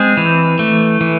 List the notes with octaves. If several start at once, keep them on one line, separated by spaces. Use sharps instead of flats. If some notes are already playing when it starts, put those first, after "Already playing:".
Already playing: G#3 C4 G#4
E3
A3
E3